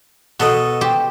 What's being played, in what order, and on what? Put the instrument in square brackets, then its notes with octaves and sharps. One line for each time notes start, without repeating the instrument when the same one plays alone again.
[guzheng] B2 [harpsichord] F#4 A4 D#5
[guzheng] G4 C5